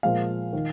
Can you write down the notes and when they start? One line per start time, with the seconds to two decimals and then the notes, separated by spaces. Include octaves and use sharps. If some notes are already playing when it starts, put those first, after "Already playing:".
0.03 A#2 F3 G#3 F5
0.53 D#3